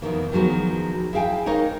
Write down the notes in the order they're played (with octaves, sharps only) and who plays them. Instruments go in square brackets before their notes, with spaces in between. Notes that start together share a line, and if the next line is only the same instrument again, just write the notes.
[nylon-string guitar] F2 B2 D#3 E3
D#3 F3 F#3 G#3 B3
E4 G#4 F5 G5 G#5
G#3 D#4 A#4 C#5 D#5 F5